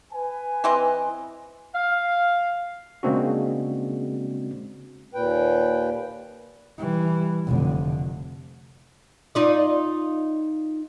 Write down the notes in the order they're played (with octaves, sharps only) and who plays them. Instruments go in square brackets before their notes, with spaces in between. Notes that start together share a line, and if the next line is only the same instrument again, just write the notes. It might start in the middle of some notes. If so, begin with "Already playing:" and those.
[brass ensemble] B4 G#5
[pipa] E3 C4 D#5
[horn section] F5
[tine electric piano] C#3 G#3 A#3 C4 D4 F#4
[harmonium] D#2 A#2 B4 G5
[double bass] E3 G3
F1 D3
[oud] D#4 F4 D5